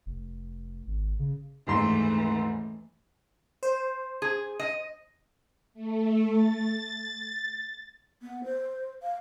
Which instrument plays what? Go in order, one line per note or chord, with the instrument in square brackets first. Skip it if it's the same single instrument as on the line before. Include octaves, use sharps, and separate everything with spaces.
[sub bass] F1
G#1
C#3
[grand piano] D#1 G#2 C6 [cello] E3 A3
[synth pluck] C5
[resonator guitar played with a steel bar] G#4
D#5
[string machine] A3
A6
[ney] B3
C5
F5